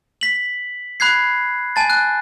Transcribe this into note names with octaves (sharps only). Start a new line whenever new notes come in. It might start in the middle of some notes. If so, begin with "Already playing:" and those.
B6 F#7
B5 F#6 G#6 C7
G#5 A5 A6
F#6